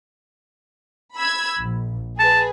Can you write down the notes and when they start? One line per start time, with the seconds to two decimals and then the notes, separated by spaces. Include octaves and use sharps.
1.15 B5 E6 G#6
1.61 A#1
2.19 G#4 B4 A5